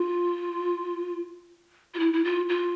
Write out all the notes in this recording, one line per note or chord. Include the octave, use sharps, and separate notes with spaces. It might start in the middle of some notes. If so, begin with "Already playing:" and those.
Already playing: F4
F4
E4
E4
F4
F4